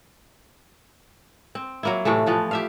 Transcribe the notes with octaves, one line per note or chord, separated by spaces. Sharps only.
C4
F#3 A#3 E4
A2 C3 E3 A3
E3 F3 B3
G4 E5 F5